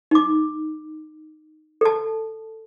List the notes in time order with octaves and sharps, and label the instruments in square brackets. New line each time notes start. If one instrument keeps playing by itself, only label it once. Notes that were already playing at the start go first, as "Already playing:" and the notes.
[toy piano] D#4 D6
A4 A5